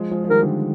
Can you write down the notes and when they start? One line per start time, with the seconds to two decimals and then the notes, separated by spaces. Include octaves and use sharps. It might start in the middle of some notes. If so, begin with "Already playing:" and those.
Already playing: F3 G#3
0.11 F3 G#3
0.24 F3
0.30 D#3 G3 A#4
0.42 D3 F3